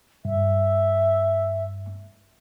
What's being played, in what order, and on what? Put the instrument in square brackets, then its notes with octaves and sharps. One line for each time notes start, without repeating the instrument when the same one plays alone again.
[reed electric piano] G2 [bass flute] E5